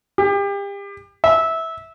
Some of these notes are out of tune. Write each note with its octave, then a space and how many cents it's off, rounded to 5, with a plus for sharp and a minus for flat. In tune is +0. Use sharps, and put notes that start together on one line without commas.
G4 +35
E5 -15